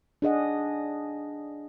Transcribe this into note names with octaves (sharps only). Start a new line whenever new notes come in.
D4 G#4 D#5 F#5